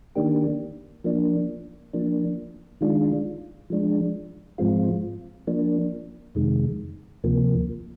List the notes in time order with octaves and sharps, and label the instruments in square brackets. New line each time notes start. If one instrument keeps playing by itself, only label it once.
[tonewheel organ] D#3 A#3 D4 G4
F3 A#3 D4
F3 A#3 D4
D#3 G#3 D4 F4
F3 G#3 D4
G#2 F3 G#3 C4 F4
F3 A#3 D4
F2 C3 D#3 G#3
D2 C3 F3 A#3